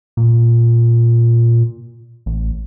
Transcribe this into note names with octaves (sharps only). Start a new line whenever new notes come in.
A#2
A1